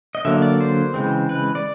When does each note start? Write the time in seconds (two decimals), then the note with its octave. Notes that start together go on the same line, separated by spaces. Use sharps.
0.15 D#5
0.25 D3 F#3 A#3 E5
0.42 D5
0.61 C5
0.94 C#3 E3 G#3 C4
1.29 B4
1.55 D5